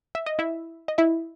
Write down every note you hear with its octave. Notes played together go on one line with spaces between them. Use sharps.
E5
D#5
E4 E5
D#5
E4 E5